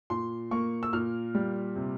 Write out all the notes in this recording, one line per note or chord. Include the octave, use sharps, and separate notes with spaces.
A#2 C6
A#3 C#6
E6
A#2 F6
G3
C3